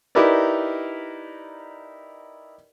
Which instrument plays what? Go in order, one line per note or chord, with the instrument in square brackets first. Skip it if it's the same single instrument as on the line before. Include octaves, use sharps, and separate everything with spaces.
[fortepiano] D#4 E4 G4 A#4 B4 D5